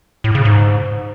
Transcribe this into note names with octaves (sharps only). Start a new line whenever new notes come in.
A2
C#3
G#2